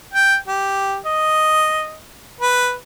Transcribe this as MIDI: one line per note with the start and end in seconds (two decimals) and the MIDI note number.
0.14 0.37 79
0.47 0.97 67
1.06 1.95 75
2.41 2.74 71